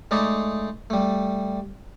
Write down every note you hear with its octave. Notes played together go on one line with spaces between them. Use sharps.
G#3 A3 D#4 D5 D#5
G3 A3